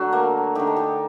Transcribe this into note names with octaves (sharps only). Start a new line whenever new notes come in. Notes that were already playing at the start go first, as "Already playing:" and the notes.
Already playing: D3 F#3 A3 F#4
A#3
D3 A3 D#4 G4
A4
D#4 G4